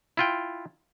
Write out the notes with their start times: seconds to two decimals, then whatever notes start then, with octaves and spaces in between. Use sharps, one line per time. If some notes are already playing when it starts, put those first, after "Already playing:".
0.17 E4 F4 G5